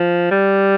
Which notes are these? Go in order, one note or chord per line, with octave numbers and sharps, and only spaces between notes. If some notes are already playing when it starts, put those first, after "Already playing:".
Already playing: F3
G3